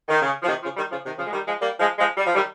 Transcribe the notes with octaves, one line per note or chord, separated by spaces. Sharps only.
D#3
C#3
F3
C3 D#3
C#3 F3
D#3 G3
C#3 F3
C3 D#3
C#3 F3
G#3
D#3 G3
F3 G#3
G3 A#3
F3 G#3
F3 G#3
G3
F3
D#3 G3